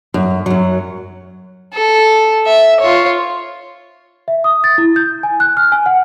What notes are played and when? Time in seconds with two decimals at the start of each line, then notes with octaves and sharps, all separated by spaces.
0.14 F#2
0.46 F#2 F#3
1.74 A4
2.46 E5
2.80 F4 C#5
4.28 E5
4.44 D#6
4.64 A6
4.78 E4
4.96 G6
5.23 G#5
5.40 F#6
5.57 F6
5.72 G#5
5.86 F#5